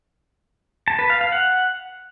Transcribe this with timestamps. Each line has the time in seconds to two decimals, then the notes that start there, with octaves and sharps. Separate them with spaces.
0.88 A5
0.99 B4
1.10 F5
1.21 F5
1.32 F#5